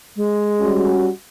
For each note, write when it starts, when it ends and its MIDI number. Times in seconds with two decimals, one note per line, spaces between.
0.16 0.92 56
0.61 1.08 55
0.61 1.08 61
0.61 1.08 66